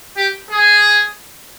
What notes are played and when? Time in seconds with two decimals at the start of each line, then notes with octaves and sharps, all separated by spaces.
0.17 G4
0.50 G#4